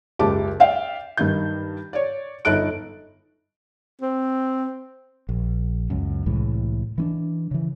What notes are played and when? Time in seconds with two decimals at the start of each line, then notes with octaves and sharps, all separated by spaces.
0.19 F#1 C#2 G4 A5 D6
0.60 D5 E5 F5 G5
1.17 G2 D#3 G6
1.93 C#5 D5
2.45 G1 D#4 A4 F#6 D7
4.01 C4
5.29 A#1
5.90 C#2 F#2
6.26 C2 A2 E3 G#3
6.98 E3 C#4 D4
7.51 C#3 E3